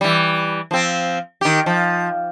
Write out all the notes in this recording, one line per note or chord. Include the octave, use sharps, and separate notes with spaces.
E3 G3
F3 C4
D#3 G4
F3